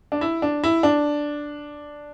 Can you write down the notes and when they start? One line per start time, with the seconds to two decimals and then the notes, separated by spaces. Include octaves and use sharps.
0.12 D4
0.21 E4
0.42 D4
0.64 E4
0.83 D4